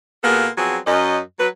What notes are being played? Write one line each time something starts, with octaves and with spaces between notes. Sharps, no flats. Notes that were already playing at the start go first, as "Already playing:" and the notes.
B2 A#3 B3 F4 G#4 A4
F3 F#3 B3 C4 G#4
F#2 C#4 D#5
F#3 B4